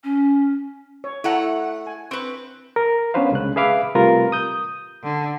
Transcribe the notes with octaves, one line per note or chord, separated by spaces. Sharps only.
C#4
C#5
A3 E4 A4 F#5 A#5
G#5
C4 B4 C#6
A#4
B3 C#4 D4 B4 C5 F5
C2 C#3 G#3 F#6
G#4 B4 E5 F5 B5 D6
C3 G3 A3 F4 A#4 B4
D#6 G6
D3